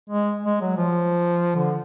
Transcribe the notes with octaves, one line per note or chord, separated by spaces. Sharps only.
G#3
G#3
F#3
F3
D3